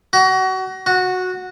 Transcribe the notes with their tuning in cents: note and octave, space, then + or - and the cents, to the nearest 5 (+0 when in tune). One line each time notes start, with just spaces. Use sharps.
F#4 +30
F#4 -10